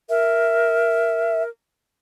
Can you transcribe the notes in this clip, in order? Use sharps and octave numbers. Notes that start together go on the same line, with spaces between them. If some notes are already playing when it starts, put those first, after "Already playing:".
A#4 E5